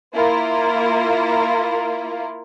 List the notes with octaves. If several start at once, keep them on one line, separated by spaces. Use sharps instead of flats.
A#3 E4 F4 A#4